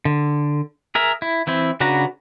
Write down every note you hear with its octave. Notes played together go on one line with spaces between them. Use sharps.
D3
G#4 A#4 E5
E4
E3 C4 E4
C#3 D4 F#4 B4 A#5